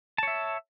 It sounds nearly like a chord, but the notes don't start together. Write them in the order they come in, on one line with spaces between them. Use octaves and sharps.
A5 C#5 E5